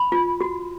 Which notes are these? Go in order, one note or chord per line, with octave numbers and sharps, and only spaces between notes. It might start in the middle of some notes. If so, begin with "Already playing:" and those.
Already playing: B5
F4
F#4